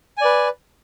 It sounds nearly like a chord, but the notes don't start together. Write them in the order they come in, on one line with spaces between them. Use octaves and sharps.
G#5 D5 B4